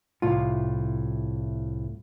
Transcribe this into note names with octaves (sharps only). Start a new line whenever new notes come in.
C2 A2 F4